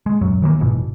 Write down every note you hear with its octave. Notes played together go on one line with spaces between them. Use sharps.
G#3
D#1 F#2 F#3
D#3 E3 G3 A#3
F#1 G#2 B2 E3